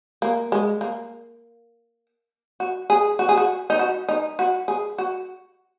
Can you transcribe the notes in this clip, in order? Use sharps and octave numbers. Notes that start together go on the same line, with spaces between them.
A#3
G#3
A#3
F#4
G#4
F#4
G#4
F#4
D#4
F#4
D#4
F#4
G#4
F#4